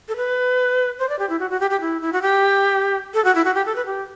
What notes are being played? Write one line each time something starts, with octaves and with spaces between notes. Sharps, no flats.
A4
B4
C5
D5
G4
E4
F#4
F#4
G4
G4
E4
E4
F#4
G4
A4
F#4
E4
F#4
G4
A4
B4
G4